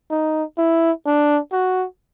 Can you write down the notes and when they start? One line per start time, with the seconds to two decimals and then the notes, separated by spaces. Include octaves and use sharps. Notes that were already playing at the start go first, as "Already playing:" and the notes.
0.10 D#4
0.58 E4
1.06 D4
1.53 F#4